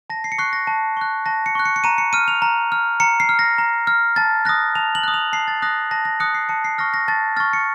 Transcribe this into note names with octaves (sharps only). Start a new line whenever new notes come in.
A5 A#6
C7
C#7
C#6 F#6 C7
A#6
A5
C#6 F#6
A5 A#6
C#7
C#6 F#6
C#7
C#7
A#5 D#7
C#7
F6 D#7
F7
A#5
F6
A#5 C#7
C7
F6
A#6
A#5
F6
A5 A6
D#6 F#6 A#6
A5 F7
F#7
D#6 F#6
F7
A5 C7
A6
D#6 F#6 A#6
A5 A#6
A#6
D#6 F#6 C#7
C7
A5 C#7
C7
C#6 F6 A#6
A#6
A5 A6
C#6 F6 A6
C#7